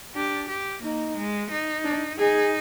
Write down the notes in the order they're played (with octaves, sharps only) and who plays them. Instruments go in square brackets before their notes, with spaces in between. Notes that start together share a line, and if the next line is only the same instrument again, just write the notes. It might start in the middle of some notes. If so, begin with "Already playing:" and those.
[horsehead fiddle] D4 [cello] G4
[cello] G4
[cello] A#3 [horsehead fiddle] D#4
[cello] G#3
D#4
[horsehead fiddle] D4
[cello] D#4 [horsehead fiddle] G#4